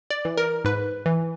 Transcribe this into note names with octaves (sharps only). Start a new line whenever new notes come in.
D5
E3
A#4
G#2 B4
E3